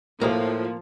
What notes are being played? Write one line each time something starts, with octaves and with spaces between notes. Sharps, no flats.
D2 A2 F3 G#3 A#3 A#4